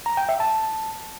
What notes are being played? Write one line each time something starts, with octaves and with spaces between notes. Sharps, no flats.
A#5
G5
E5
A5